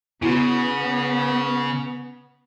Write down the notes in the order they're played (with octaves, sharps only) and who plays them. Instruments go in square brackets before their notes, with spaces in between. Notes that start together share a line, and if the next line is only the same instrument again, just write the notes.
[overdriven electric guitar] C#3 [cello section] B3 [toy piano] E4 F#4